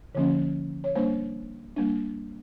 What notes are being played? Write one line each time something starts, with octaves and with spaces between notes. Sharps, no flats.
D3 F3 A#3 C#4
C#5
G3 A#3 D4 C5
G3 A#3 D4